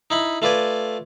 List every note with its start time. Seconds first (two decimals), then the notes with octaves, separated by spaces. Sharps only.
0.10 D#4 E4 B5
0.42 A3 F4 B4 D5 G#5